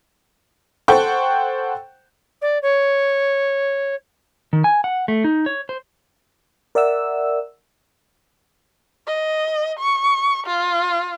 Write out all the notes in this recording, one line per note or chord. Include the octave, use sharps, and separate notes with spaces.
A4 C5 F#5 G5 C#6
D5
C#5
D#3
G#5
F#5
A3
D#4
C#5
C5
A#4 D5 E5 F#5 E6
D#5
C#6
F4